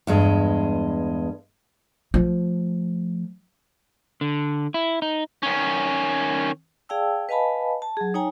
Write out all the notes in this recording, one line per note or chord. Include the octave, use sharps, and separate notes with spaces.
E2 G2 G#3
F3 A3
D3
E4
D#4
D#3 C#4
G#4 D5 F5 G5 A5 E6
B4 D#5 F5 G#5 A5 B5
A5
F#3 G#4
D#4 C#5 G5 G#5 A#5